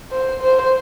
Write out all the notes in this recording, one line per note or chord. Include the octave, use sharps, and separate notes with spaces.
C5
C5